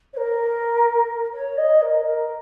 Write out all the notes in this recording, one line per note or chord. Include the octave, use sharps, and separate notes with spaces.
C#5
A#4
C#5
D#5
A#4
A#4